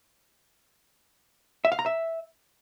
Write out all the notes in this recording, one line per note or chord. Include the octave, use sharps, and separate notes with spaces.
E5
F5
A#5
E5